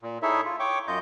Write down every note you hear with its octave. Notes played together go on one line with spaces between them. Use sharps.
A#2
D#4 E4 G#4 A4 C#5 E5
F4
C#5 G5 C#6 D6
F#2 F4 D#5 G6